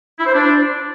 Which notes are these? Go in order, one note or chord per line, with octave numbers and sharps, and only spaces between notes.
E4
C5
D4